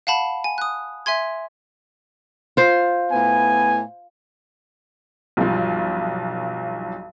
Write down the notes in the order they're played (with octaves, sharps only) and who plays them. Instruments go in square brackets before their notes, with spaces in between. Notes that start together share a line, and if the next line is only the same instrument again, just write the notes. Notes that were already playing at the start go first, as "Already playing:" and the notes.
[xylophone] F5 F#5 A5 B5
G#5
D#6 F#6
E5 G#5 C6 G#6
[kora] F4 C5
[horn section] A2 B3 G#5
[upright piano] B1 G2 F3